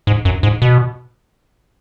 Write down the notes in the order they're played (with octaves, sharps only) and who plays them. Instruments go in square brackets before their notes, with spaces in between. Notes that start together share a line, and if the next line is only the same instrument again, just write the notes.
[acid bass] G#2
F#2
G#2
B2